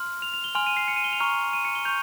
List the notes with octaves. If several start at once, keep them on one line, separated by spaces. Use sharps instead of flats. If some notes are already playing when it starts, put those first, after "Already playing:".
Already playing: C6 F6
F7
F7
G7
G#5 C6 F6 F7
D#7
C7
C#7
D#7
G7
F7
A#5 C#6 F6
D#7
C#7
G7
C#6 G6 F7